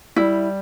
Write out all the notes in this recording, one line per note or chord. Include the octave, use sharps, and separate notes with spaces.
G3 E4